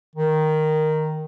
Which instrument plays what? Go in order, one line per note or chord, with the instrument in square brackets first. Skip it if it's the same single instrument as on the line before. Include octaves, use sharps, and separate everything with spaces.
[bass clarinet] D#3